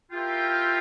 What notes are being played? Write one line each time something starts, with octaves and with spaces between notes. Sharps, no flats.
E4 F4 G4 A#4 E5 G5